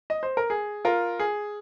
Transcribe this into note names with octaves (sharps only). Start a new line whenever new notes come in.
D#5
C5
A#4
G#4
F4 A#4
G#4